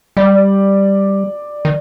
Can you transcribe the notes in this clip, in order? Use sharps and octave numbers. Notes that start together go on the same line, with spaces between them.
G3 D5
D#3